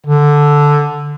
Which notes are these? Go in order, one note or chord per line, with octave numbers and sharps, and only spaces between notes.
D3